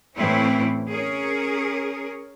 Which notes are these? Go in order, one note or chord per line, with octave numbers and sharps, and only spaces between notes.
A2 E3 A3 C4 C#4 E4
C#4 G#4 A#4